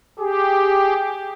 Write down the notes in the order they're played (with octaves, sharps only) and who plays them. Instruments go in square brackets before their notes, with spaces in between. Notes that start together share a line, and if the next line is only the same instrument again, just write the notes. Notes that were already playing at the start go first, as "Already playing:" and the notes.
[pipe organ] G4 [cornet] G#4